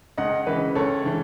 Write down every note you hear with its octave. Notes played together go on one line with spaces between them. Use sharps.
C#2 D#5 F#5
C#3 E3 B4 D#5
C#2 A4 C#5
C#3 E3